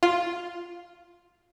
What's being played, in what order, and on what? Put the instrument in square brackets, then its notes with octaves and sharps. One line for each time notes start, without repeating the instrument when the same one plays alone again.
[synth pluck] F4